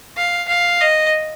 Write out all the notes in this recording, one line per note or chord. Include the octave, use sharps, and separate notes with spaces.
F5
F5
D#5